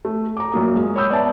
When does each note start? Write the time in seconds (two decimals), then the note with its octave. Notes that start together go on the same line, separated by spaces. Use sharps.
0.05 A3
0.37 A#5 D6
0.52 F#2 A#2 A#3 D#6
0.76 G#3
0.96 C#5 B5 D#6 E6 G6
1.09 B3 D5 E5 A5